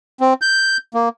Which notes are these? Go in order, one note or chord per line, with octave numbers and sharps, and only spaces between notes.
C4
G6
A#3